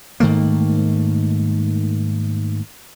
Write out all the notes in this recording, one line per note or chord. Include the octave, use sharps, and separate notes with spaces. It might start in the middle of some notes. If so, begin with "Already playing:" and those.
G#2 D#3 A3 A#3